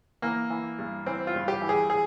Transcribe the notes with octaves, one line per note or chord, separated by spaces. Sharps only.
E3 A#3
E3
G2
E3 C4
F4
G2
G4
E3
G#4
G#4